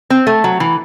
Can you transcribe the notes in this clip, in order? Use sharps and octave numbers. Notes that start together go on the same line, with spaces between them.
C4
A3
F#3
E3